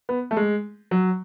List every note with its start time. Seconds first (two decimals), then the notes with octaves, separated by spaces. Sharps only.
0.09 B3
0.31 A3
0.37 G#3
0.91 F#3